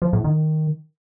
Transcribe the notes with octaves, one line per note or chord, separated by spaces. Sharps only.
F3
A2
D#3